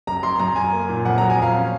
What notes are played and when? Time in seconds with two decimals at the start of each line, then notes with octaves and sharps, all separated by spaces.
0.07 F#2 A#5
0.23 F#2 C6
0.39 F#2 A#5
0.56 F#3 G#5
0.73 A#3
0.89 A#2
1.05 F2 F#5
1.18 F#3 A#5
1.30 G#5
1.38 F2 F5
1.54 C#4